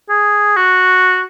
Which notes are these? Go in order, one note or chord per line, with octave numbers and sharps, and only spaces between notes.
G#4
F#4